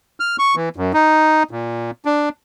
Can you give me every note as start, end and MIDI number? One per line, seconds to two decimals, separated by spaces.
0.20 0.36 89
0.39 0.55 85
0.55 0.69 52
0.76 0.92 42
0.94 1.43 63
1.51 1.91 46
2.05 2.29 62